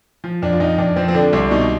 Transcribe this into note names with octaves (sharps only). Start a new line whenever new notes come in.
F3
F2 D4
F4
F2 D#4
F2 D4
F3 C4
C4
D3 D4
C2 D4
B2 D#4